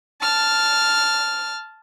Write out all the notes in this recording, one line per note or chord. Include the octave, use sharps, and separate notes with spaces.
A5 F6